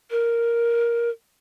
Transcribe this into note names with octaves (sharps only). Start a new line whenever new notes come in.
A#4